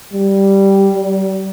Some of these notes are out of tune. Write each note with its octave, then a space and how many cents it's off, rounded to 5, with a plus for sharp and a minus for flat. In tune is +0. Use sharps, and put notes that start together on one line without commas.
G3 -5
G3 -35